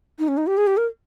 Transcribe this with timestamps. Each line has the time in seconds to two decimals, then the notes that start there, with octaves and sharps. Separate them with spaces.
0.19 D#4
0.28 C#4
0.37 D#4
0.47 G4
0.57 G#4
0.67 G4
0.77 A#4